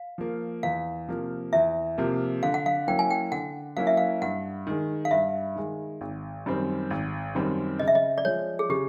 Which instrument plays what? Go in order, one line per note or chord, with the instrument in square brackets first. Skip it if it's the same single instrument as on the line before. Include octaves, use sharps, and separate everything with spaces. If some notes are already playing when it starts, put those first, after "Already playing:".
Already playing: [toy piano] F5
[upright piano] F3 A#3
[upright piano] E2 [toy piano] F5
[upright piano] C3 F3 A#3
[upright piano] E2 [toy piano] E5
[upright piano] C3 F3 A#3
[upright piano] D3 [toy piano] F5
[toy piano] F#5
F5
[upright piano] F#3 A#3 C#4 E4 [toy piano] G5
[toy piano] G#5
G5
[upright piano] D3 [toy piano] F#5
[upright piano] F#3 A#3 C#4 E4 [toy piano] F5
[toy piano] E5
F5
[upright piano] G2 [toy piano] F#5
[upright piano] D#3 G#3
[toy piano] F5
[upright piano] G2 [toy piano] E5
[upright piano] D#3 G#3
G#1
F#2 D#3 G3 C4
G#1
F#2 D#3 G3 C4
[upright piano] C#3 [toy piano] D#5
[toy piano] E5
D#5
D5
[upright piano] F3 G#3 [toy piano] C#5
[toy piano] G#4
[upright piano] C#3 [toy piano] G4